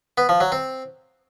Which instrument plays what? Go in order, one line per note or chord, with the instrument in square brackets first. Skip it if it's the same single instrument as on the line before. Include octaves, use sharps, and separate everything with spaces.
[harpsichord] B3
F3
F#3
C4